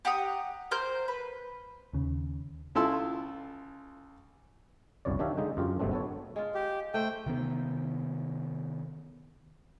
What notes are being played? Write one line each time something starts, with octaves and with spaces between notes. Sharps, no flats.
G4 F#5 A#5 D#6
A#4 C5 G6
B4
D#2 C#3
C#2 E4 F4 A4 C6 E6
G1 C2 F#2 C#5 D5
D#3 D4 G4 C#5 E5 F5
D3 G#3 D#4 G5
F#2 F4 G4
G1 G2 B2 A3 C4 D4
B3 A4 C#5
G#3 F4
G4
A3 C5 G5
C3 D#3 B3